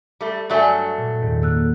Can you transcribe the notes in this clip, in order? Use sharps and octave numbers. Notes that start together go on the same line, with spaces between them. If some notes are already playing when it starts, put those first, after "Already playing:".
G3 A3
G2 F#3 A3 D5 G#5
A#2
E2 G#2 D#3
A#3 E6 F#6